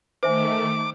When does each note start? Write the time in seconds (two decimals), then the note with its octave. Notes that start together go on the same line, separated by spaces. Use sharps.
0.23 D#3 A3 C5 E5 G#5 D6